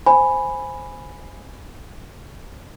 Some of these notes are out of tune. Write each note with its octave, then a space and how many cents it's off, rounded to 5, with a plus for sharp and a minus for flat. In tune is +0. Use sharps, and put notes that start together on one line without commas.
C5 +0 G#5 +0 B5 +0